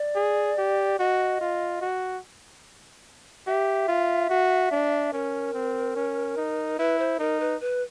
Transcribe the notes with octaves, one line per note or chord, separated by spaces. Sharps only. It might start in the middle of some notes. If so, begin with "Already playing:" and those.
Already playing: D5
G#4
G4
F#4 D#5
F4
F#4
G4 E5
F4
F#4
D4
C#4 A#4
C4
C#4
D#4
E4 B4
C5
D#4 A#4
B4
B4